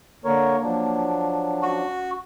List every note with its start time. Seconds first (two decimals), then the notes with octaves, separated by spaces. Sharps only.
0.25 D3 A#3 A#4 C#5
0.63 F3 F#3 D4
1.62 C#4 F#4